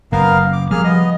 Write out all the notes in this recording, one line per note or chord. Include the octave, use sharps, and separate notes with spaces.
F#1 F#2 B3 A#4 F5
D6
F3 G3 A#3 G#4 F6
B3 D#5